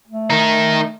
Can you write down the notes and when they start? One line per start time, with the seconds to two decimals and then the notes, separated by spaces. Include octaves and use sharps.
0.08 A3
0.30 D#3 D#4